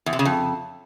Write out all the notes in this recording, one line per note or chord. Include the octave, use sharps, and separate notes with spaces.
E2
C3
C#3
F2